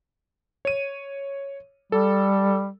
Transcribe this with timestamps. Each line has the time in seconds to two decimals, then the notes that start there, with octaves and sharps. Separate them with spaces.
0.65 C#5 D#7
1.92 G3 A4